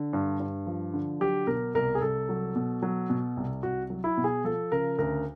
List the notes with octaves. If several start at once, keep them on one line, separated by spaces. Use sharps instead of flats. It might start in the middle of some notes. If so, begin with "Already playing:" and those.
Already playing: D3
G2
G2
F3
D3
F#3 G4
B2 A#4
C2 A#4
G#4
C2 A4
F#3
B2
F#3
B2
C2
C2 F#4
F#3
E4
B2
G#4
F3 A4
C#3 A#4
D2 A#4